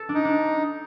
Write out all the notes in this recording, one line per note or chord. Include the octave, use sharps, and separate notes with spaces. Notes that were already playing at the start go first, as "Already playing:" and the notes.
Already playing: A4
D4
D#4
D4